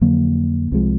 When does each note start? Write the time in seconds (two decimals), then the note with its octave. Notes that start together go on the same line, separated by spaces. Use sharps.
0.01 F2 D3 F#3 A#3
0.72 C2 C3 F3 G#3